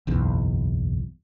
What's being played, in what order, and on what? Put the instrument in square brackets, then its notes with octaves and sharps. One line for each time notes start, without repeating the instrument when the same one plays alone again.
[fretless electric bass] F#1 B1 E2